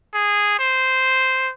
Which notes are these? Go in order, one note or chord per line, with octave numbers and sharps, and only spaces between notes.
G#4
C5